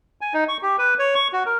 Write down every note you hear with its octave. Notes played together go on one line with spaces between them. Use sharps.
G#5
D#4
C#6
G4
B4
C#5
C#6
F#4
A#4